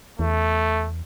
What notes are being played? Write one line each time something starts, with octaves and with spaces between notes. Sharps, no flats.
E2 A3